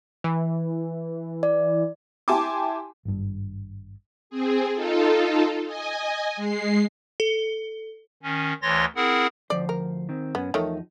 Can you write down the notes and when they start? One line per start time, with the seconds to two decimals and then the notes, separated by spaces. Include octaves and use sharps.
0.24 E3
1.43 D5
2.28 E4 G4 G#5 A5 C6 D6
3.05 G#1 G2
4.30 C4 G#4
4.73 D#4 F4 A4
5.66 D#5 G#5
6.36 G#3 C7
7.20 A4
8.23 D#3 C#4
8.62 D2 E3 C#5 C6 A6 A#6
8.96 C4 E4 G#4 A#4 F#5
9.50 D2 F3 C5 D5
9.69 A#4
10.09 D#3 C4
10.35 F#2 B3 C#4
10.54 E2 D#3 F3 A3 D#4 C#5